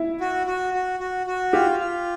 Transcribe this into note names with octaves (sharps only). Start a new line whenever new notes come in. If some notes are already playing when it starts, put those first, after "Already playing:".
Already playing: E4
F#4
F#4
F#4
F#4
F#4
F4 G4
F4